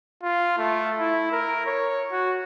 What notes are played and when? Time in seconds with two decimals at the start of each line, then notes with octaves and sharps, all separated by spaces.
0.23 F4
0.58 A3
0.99 E4
1.32 A#4
1.66 C#5
2.12 F#4